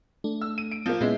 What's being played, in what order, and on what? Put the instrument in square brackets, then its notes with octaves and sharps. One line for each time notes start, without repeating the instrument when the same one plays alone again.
[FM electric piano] A3 D4
[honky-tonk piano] E6
D#7
D7
F3 A#3
[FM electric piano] A#2 B3 C#4 [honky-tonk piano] G#3 E4